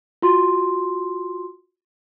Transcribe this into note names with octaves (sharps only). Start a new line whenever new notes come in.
F4 F#4 C6